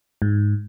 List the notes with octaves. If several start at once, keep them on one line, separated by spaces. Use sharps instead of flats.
G#2